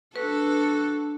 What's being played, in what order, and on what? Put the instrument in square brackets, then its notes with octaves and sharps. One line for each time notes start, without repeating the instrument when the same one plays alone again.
[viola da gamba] D4 A4 [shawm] F#4 [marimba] B4